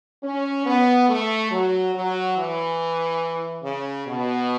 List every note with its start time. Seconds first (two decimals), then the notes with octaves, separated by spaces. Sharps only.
0.23 C#4
0.66 B3
1.09 A3
1.51 F#3
1.94 F#3
2.36 E3
3.63 C#3
4.06 B2